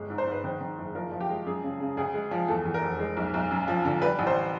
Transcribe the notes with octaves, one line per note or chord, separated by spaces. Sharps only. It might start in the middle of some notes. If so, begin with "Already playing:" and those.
Already playing: G1 G#3
G#2
C5
G#2 B4
D#3 C5
D#3
F#1
F3 A#4
F3
G4
G#3
F#2 G#4
C#3
C#3
D2 G#4
G#3
F3
E2 A4
E2
A#4
F1
G#3
B1
B1
F#2
F3
D3
G3 B4
A1
C5